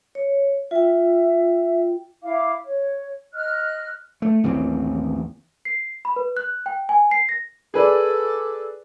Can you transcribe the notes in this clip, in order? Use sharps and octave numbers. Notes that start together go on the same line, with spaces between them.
C#5
F4 E5 G5
E4 F5 D6
C#5
D#5 F6 F#6
A3
A1 D#2 E3 C4
C7
B5
B4
F#6
G5
G#5
C7
A#6
G#4 A4 B4 D5